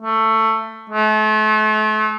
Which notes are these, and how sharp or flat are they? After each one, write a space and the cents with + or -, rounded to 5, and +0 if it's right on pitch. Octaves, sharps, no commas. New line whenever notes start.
A3 +15
A3 -35